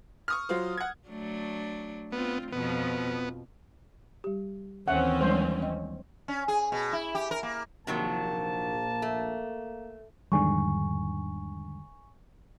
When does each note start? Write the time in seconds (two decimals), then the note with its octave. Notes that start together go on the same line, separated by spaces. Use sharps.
0.28 C#6 D#6 F6
0.49 F#3 F4 C5
0.77 F#5 G#6
1.09 F#3 A3 D4
2.13 B3 C4 F4
2.52 F2 B2 F3 B3
4.24 G3 G4
4.88 D#2 E3 C4 C#4 E5 F#5
5.21 F3 G3 G#3 D4 C5
5.62 D#5 G5
6.28 C#4
6.48 G#4
6.72 B2
6.93 E4
7.15 G4
7.31 A#4
7.43 A#3
7.87 A#1 C3 D#3 F#3 A#3 A5
9.02 A3
10.32 E2 G#2 D3 D#3 G3 G#5 C#6